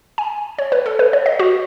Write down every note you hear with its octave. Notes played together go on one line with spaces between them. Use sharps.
G#5
C#5
B4
A4
B4
C#5
D#5
F#4